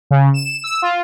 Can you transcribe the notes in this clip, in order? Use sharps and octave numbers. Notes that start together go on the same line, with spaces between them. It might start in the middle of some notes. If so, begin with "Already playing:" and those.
C#3
E7
E6
F4